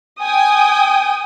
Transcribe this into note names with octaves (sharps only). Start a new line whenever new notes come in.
G5 G#5 D#6